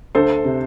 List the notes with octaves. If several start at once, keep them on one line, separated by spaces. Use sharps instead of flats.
D2 A4 C5
C3